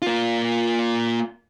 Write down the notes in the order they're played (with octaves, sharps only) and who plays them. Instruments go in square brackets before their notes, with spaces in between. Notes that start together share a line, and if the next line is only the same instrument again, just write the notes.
[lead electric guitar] A#3 F4